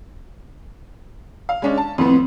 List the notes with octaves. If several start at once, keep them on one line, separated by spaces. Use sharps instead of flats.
F5
G#3 C#4 D4
A5
F2 A2 B3 C4